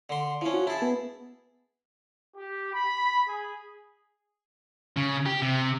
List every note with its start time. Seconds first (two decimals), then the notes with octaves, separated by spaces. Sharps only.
0.09 D3 C6
0.41 F3 C#4 E4
0.54 F#4
0.67 E4 G#4 A5
0.82 B3
2.35 G4
2.72 B5
3.26 G#4
4.97 C#3
5.26 G4
5.42 C3